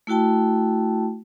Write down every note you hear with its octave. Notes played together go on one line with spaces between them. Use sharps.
A3 E4 F#4 G5 A5